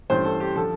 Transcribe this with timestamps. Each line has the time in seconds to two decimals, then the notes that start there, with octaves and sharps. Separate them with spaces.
0.10 G2 E3 A3 C#4 C5
0.25 A4
0.40 G4
0.55 D3 F3 A4